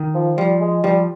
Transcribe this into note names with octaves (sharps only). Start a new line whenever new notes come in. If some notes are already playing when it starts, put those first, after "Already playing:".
Already playing: D#3
F3
F3 G3
G#3
F3 G3